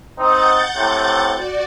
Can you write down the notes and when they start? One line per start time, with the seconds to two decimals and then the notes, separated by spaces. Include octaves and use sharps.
0.18 C4 D#4 F#5 G6 A6
0.76 A2 C3
1.32 F#4 D5